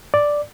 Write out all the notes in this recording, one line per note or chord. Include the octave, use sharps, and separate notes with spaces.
D5